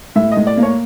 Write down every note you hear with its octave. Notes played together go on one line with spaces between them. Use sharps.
A2 E5
D#5
A2
D5
A#3
C#5